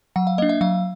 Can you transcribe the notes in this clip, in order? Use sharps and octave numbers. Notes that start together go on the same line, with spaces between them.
F#3 F#5
F5
A#3 D4 D#5
E5
F#3 F5